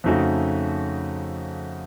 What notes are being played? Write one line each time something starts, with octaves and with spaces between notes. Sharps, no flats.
F2 C#3 A3 D#4 F#4